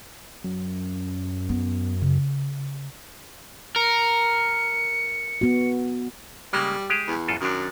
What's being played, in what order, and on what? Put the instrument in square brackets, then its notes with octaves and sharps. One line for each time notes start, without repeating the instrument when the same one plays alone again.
[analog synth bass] F#2
[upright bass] B3
C#3
[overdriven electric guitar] A#4 [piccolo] C#7
[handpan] B3 F#4
[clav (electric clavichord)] C#3 G#3 A#3 [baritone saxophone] G3
[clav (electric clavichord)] G#3 G4 G#4
[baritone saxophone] E2
[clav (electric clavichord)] F#2 F4 A4
[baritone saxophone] F#2 [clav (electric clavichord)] D#3 D4